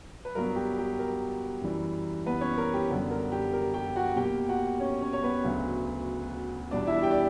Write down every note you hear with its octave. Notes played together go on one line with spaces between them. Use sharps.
B4
G2 F#3 B3 A#4
G4
G4
A#4
F#2 E3 G3
B3 B4
C#4 C#5
A#4
G4
F#2 D3 G3 B3
A#4
G4
A#4
G4 G5
F#4 F#5
B2 A#3 G4 G5
F#4 F#5
C#4 C#5
C#4 C#5
C#5
B3 B4
D2 C#3 F#3
E2 B2 G3 B3 D4 D5
E4 E5
G4 G5
D5